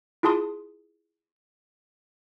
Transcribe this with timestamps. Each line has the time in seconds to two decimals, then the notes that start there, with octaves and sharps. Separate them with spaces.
0.23 E4 F4 G#4 A5 C6 D#6